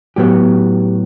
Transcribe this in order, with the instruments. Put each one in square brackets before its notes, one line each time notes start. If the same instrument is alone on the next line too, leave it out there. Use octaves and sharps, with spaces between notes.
[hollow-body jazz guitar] A2 F#3 B3 G4